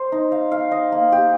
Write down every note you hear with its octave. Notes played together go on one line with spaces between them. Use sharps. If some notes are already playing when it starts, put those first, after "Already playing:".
Already playing: C5
D#4
F5
F5
D#5
A#3
G4